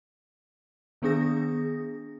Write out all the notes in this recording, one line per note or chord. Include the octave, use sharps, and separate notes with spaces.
D#3 B3 D4 G#4 D#6 A#6